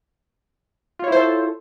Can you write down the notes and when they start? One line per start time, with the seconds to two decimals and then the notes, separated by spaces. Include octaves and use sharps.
0.99 F4
1.04 C#5
1.08 E4
1.12 C5
1.17 A4